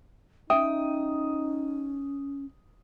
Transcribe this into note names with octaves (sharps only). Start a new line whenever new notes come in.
C#4 D#4 E5 G5 D#6